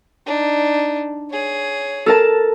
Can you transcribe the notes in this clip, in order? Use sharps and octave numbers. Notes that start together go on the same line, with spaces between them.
D4 D#4
G#4 C#5
A4 A#4 A5